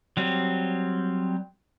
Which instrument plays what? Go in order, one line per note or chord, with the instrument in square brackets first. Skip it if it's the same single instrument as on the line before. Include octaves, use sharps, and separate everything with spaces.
[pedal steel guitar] F#3 G3 C4